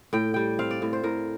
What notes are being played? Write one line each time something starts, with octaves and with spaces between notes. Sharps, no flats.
A2 G5
G3 G5
C4 F5
D5
A2
C5
A2 A#4